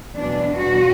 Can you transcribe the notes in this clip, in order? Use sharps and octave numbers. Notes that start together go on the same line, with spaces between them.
E2 B2 F#3 D4
F#4